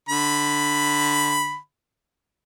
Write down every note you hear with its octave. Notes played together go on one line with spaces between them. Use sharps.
D3 B5